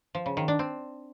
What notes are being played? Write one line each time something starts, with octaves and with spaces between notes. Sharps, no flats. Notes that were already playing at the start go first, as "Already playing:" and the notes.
F3
C#3
D#3
D4
C4